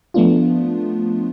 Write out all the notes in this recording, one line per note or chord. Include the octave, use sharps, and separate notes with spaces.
F3 A3 B3 D4 F4